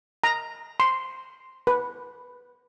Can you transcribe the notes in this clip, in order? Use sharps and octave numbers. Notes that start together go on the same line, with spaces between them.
A#5
C6
B4